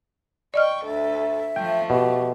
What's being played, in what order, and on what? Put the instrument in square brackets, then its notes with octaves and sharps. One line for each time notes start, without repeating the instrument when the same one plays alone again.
[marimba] D5 D#5 F6 [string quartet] G5 C#6
[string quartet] D2 A4 [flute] E5
[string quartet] F3 A3 [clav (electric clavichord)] G5
[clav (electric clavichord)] B2 [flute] G4